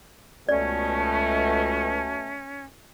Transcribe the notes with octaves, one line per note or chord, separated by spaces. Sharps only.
C#2 B2 A3 C#4 D5